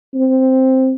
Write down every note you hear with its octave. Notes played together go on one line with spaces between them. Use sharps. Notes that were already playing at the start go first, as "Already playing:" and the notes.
C4